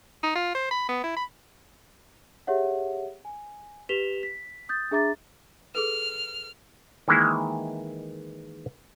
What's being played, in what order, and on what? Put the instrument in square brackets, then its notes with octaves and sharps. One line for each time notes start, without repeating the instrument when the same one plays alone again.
[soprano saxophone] D#4
F4
C5
B5
B3
E4
B5
[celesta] G4 G#4 C#5 E5 F#5
G#5
G4 B4 B6 E7 F7 G7
B6
D#6 G6 A6
D4 G#4 E5 A#5 D6 A6
[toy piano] G#4 A4 B4 [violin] F6
[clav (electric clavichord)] D#3 E3 G#3 A#3 E4